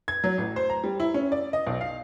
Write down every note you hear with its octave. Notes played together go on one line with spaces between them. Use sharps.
G#6
F#3
A1
C5
A#5
G3
E4
C#4
D5
D#5
B1
F5